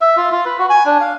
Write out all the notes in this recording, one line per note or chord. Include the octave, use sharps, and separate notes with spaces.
E5
F4
F4
B4
F#4
G#5
D4
F5